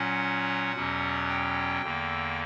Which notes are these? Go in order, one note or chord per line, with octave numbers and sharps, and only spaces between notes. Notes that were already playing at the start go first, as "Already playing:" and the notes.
Already playing: A#2 F#3 C#4 F#5
E2 B2 F#3 C#4
G5
E2 D3 A#3